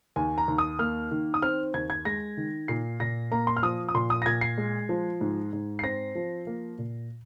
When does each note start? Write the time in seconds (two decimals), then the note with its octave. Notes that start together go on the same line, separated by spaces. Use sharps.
0.16 D#2 G#5
0.38 A#5
0.48 D#2
0.58 D#6
0.79 A#3 F6
1.11 D#3
1.34 D#6
1.42 C4 F6
1.74 D#2 G#6
1.90 G#6
2.05 G#3 A#6
2.37 D#3
2.68 A#2 C7
3.00 A#2 A#6
3.32 A#3 A#5
3.47 C6
3.57 F6
3.63 F3 D#6
3.89 D#6
3.94 A#2 C6
4.10 D#6
4.22 A#6
4.26 A#2 G#6
4.41 C7
4.58 G#3
4.89 F3
5.21 G#2
5.53 G#2
5.79 C7
5.84 C4 A#6
6.15 F3
6.47 A#3
6.78 A#2